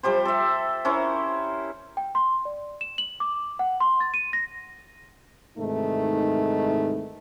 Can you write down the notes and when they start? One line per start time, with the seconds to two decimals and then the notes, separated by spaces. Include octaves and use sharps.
0.03 F3 G3 G4 C5
0.25 A4 E5
0.85 C#4 E4 A#4 C5
1.97 G5
2.15 C6
2.45 D5
2.81 E7
2.98 F#7
3.20 D6
3.59 F#5
3.81 C6
4.00 A6
4.14 D#7
4.33 A#6
5.58 G#2 C3 D#3 E3 A3 D#4